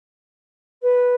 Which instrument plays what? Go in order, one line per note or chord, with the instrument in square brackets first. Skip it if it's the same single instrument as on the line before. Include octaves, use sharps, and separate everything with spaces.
[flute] B4